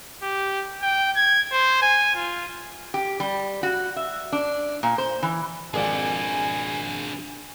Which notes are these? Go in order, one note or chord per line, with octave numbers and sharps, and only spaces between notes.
G4
G5
G#6
C5
G#5
F4
G4
G3
F#4
E5
D4
A#2
C5
E3
G#1 F2 D4 G#4 D5 G#5